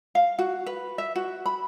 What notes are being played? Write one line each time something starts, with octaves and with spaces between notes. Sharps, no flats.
F5
F#4
B4
E5
F#4
B5